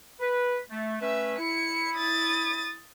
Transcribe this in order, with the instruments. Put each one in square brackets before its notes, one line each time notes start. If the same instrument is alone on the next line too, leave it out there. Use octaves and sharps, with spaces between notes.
[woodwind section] B4
A3
[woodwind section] A3 C#4 B4 [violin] E5
[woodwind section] E4 [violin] C#7
[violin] D#6 A6